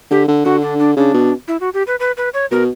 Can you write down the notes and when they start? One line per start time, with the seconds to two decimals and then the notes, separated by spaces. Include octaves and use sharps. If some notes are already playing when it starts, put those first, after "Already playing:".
0.10 D3 G4
0.28 D3
0.45 D3 F#4
0.62 D4
0.79 D4
0.97 C#3 D4
1.14 B2
1.48 E4
1.60 F#4
1.74 G4
1.87 B4
2.00 B4
2.17 B4
2.34 C#5
2.51 B2 A#4